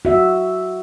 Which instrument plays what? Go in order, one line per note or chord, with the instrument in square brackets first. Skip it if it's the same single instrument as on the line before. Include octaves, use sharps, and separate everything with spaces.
[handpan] F#4 E5